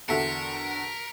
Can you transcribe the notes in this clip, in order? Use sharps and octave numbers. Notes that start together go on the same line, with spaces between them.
E2 D3 F#4 A4 A#4 E5 B6 C#7